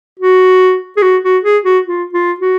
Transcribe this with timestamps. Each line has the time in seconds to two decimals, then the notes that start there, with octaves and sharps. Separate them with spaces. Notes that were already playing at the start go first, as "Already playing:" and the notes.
0.20 F#4
0.97 G#4
1.02 F#4
1.24 F#4
1.44 G#4
1.64 F#4
1.85 F4
2.13 F4
2.40 F#4